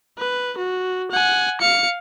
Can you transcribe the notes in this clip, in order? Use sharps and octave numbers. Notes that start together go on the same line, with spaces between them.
B4
F#4
F#5 G#5
F5 C#7